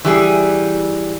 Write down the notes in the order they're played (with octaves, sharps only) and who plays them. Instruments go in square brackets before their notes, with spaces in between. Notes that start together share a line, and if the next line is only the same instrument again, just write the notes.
[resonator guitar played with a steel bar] E3 G3 G#4